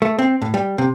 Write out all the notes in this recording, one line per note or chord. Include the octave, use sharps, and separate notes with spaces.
A3
C4
A2
G3
C3